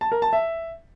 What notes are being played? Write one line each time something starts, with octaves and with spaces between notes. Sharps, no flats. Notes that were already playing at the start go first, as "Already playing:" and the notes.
A5
A#4
A5
E5